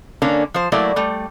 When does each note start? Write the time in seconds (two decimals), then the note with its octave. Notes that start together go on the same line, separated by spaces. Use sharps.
0.22 D3 A#3 C#4 D4
0.54 F3 C5
0.72 F#3 A3 A#3 E4 D5
0.96 G3 A3